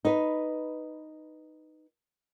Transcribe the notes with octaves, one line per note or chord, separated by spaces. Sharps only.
D#4 B4